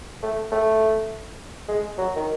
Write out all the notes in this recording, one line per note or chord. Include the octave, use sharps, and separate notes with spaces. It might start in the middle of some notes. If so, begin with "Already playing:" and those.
A3
A3
G#3
F#3
D#3